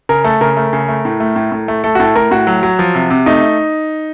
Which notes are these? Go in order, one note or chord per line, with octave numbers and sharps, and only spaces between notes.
C#3 A#4
A3 A4
C#3 A#4
A3
C#3
A3
A2
A3
A2
A2
A3
A3 A4
F#4
A2 A4
A2 A#4
A2 F#4
F#3
F#3
F3
C3
C3
A3 D#4